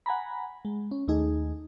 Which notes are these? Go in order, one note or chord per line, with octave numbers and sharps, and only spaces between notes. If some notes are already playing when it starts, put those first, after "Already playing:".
F#5 G#5 A#5 B5
G#3
C#4
D#2 A3 D#4 G#4